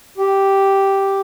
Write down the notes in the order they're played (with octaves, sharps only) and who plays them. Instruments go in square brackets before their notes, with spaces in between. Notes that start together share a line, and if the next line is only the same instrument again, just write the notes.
[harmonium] G4